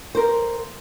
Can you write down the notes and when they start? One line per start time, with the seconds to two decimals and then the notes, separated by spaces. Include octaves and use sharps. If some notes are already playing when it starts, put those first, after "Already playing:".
0.15 A#4 C5